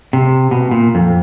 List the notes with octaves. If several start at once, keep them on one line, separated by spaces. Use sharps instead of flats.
C3
B2
A#2
F2